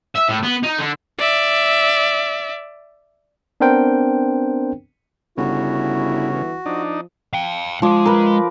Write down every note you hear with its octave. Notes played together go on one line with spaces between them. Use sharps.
E5
A2
B3
D#4
D3
D5 E5
B3 C4 D4 A#4 C5 G5
G1 C#3 E4 F#4
E3
F3 D4 D#4
F5 G5
F3 G#3 D6
A#4 B4